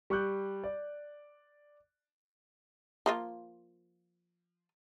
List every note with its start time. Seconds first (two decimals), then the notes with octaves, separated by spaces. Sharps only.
0.10 G3 C#6 D6 F#6 G6
0.64 D5
3.06 F3 A#3 F4